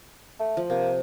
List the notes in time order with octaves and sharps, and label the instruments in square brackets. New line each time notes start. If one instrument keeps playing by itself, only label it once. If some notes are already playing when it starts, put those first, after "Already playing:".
[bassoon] A3
[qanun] F3
[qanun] C3 [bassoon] A#3